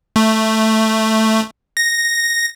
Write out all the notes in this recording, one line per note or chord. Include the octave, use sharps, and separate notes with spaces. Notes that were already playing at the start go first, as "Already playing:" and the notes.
A3
A#6